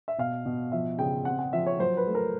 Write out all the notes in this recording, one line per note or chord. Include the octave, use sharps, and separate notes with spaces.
E5
B2 F5
B2
F3 E5
C#3 G5
C4 F#5
F#5
F3 E5
C#5
F#3 C5
B4
A3
A#4